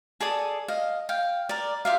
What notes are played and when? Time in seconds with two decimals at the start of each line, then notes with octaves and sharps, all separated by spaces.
0.20 G#4 A4 D5 D#6
0.68 D#5 F5
1.09 F5 G5
1.49 A#4 D5
1.85 F4 G4 E5 F5